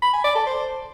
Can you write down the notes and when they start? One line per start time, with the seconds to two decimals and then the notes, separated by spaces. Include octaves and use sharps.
0.02 B5
0.13 G#5
0.24 D5
0.35 A4
0.46 C5